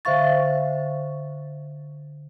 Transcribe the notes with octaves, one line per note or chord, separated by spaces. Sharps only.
D3 C5 E5 F5 C#6 A6